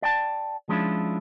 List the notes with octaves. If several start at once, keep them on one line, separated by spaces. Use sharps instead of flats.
D5 G5 A5
F3 G#3 C#4 D4 E4 F4